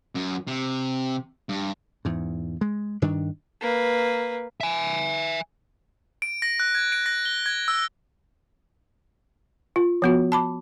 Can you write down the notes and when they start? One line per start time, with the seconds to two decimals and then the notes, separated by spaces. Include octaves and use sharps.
0.15 F#2
0.47 C3
1.49 G2
2.05 E2 G#2
2.61 G#3
3.02 G2 D#3 D4
3.61 A#3 B4
4.61 E5 G#5
6.22 D7
6.42 A#6
6.60 F#6
6.75 G#6
6.92 D7
7.06 A#6
7.25 G7
7.46 G#6
7.68 E6
9.76 F4
10.02 F3 B3 F#4
10.32 A5 B5 D6